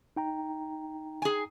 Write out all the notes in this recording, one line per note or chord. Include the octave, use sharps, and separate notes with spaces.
D#4 G5 A#5
G#4 G#5